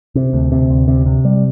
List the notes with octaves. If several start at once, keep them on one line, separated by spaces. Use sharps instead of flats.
C3
D2
C3
D2
C3
C3
G3